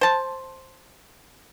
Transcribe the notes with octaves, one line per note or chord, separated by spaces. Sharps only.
C5 A5